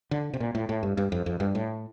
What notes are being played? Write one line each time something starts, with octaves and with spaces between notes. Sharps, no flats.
D3
C3
A#2
A2
A2
G2
G2
F2
F2
G2
A2